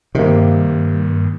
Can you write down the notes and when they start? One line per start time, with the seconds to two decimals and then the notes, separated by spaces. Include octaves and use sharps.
0.15 G2 C3 D#3 A#3